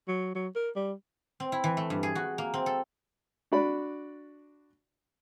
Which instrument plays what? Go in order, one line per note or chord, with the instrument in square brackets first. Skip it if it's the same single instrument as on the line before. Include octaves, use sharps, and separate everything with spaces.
[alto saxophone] F#3
F#3
A#4
G3
[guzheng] C4
E4
E3
A3
G2
G#4
F#4
A#3
C4
A4
[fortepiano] D4 F#4 D5 B5